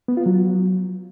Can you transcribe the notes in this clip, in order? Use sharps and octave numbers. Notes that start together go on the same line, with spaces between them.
B3
F4
F#3